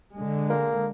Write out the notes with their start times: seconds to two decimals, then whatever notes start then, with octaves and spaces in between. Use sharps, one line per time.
0.14 D3 G#3
0.50 A#3